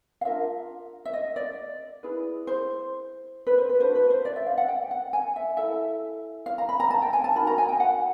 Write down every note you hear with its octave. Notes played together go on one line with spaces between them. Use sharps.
F5
D4 F4 A#4 E5
E5
D#5
D5
E4 G#4 B4
C5
B4
C5
B4
D4 F#4 B4 C5
B4
C5
D5
E5
F5
F#5
G5
F#5
G#5
E5
E4 A4 E5
F5
A#5
B5
A#5
A5
G5
G#5
A5
D#4 F#4 A#4 B5
A#5
G#5
G5
F#5